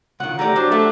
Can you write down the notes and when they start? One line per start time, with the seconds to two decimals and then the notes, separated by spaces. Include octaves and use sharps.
0.20 C#2 D#3 F#5
0.39 E3 A3 G4 D5 A#5
0.56 F#3 D4 C5
0.71 E2 A3 E5 F#5